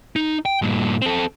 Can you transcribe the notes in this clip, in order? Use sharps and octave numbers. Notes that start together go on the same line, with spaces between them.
D#4
G5
G2 A#2
C4 A4